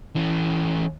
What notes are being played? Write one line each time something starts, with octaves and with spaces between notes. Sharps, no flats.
E3 C#4